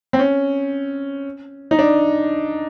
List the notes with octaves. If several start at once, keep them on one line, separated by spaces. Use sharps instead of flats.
C4
C#4
D#4
D4